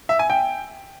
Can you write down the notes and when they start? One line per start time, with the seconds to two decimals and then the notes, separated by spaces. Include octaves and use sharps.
0.09 E5
0.19 G#5
0.30 G5